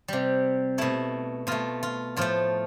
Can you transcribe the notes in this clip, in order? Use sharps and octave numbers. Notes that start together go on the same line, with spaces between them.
C3 G3
B2 A3 E4
B2 A3 F4
F4
A2 F3 A3 F4